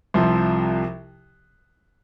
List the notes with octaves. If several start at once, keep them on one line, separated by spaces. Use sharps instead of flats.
C2 C3 F3